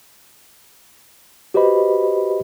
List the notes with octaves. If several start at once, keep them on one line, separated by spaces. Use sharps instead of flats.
F#4 G4 B4 C5 D#5 B5